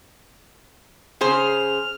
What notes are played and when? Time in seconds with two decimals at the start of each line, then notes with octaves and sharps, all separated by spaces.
1.21 C#3 G#4 C5 F6